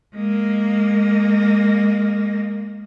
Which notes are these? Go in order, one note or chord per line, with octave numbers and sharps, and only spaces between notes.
G#3 A#3